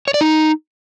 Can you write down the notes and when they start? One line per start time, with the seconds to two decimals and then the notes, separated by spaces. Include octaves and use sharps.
0.08 C#5
0.14 D5
0.21 D#4